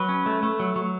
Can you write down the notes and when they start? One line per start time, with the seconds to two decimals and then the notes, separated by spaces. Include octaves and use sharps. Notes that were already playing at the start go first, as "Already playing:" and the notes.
Already playing: F#3 B4
0.09 C#4
0.26 A3
0.43 A3
0.60 F#3
0.76 F#3